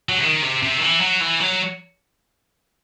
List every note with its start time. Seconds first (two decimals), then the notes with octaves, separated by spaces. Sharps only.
0.09 F#3
0.18 C3
0.23 D#3
0.42 C3
0.63 C3
0.78 D#3
0.83 E3
1.01 F#3
1.21 E3
1.40 F#3